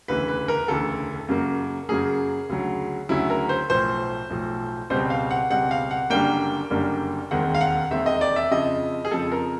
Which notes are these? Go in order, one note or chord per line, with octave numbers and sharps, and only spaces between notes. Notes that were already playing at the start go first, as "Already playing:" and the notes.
E1 D2 C#3 E3 B4
B4
A#4
E1 D2 C#3 E3 A4
F#2 C#3 F#3 A#3
F#2 C#3 F#3 A#3 G#4
D2 C#3 F#3
D2 C#3 F#3 E4
A#4
C5
B1 A2 F3 C5
B1 A2 F3
C#2 B2 G3 C4 C5
F5
F#5
C#2 B2 G3 C4 F#5
F5
F#5
F#1 F#2 D3 G3 A#3 G5
F#1 F#2 D3 G3 A#3
E1 D#2 D#3 G#3 C4 F#5
F5
F#5
E1 D#2 D#3 G#3 C4 E5
D#5
D5
E5
F2 C#3 F3 D#5
G#4
F2 C#3 F3 A4
A#4